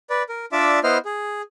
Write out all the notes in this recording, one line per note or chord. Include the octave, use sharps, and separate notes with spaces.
B4 D5
A#4
D4 F4 D5 E5 D6 E6
B3 E4 C5 D#5 F6
G#4